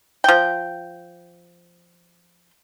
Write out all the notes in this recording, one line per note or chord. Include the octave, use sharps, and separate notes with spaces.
F3 G5